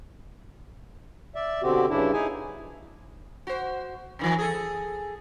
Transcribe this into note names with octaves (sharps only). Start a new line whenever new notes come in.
D5 E5
B2 D3 C4 F#4 G4
G2 C#3 D4 E4
D#4 E4 G#4 G#5
F#4 C5
C3 D#3 E3
G#4 A4